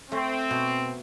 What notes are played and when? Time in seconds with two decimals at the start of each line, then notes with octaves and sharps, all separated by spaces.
0.12 A3 C4
0.51 B2